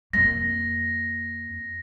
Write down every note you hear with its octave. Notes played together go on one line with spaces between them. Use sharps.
F2 A#3 A#6